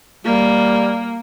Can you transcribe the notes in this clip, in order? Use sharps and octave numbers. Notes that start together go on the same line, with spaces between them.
G3 A#3